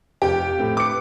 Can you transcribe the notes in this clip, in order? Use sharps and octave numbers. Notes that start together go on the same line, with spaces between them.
F1 F2 G4
A2 A3 C4
B4 D6 C#7